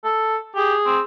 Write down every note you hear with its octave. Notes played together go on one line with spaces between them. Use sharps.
A4
G4 G#4
C4